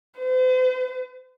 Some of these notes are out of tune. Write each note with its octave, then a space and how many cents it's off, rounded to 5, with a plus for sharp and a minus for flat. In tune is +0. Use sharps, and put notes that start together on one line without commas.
C5 -45